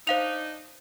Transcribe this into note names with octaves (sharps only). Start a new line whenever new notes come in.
D4 D#4 C5 F5 F7